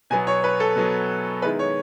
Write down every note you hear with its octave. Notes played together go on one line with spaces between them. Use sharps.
B2 F#3 B3 G#5
C#5
B4
A4
B2 F#3 B3
D#3 G#3 B3 E4 B4
C#5